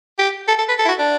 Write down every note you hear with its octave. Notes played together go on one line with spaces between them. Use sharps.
G4
A4
A4
B4
A4
E4
F#4
D4